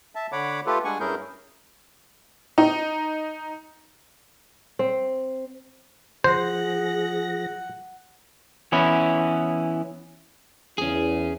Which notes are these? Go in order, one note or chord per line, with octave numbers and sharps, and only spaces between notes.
E5 A5
D3 C#5 F#5 B5 D6
A3 F4 G4 A4 B4
G3 G#3 D4 F#5 G#5 C#6
G2 C#4 E4 G#4 A#4 G6
D#4
C4
F3 G#4 C5 F#5 A#6
E3 B3 C#4 E4
E2 C#4 E4 G#4